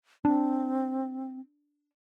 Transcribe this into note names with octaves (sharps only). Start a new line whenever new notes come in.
C4 D4